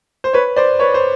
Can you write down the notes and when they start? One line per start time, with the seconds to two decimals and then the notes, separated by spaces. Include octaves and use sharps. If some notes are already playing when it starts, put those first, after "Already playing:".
0.24 C5
0.33 B4 C#5
0.56 C5 D5
0.79 B4 C#5
0.94 C5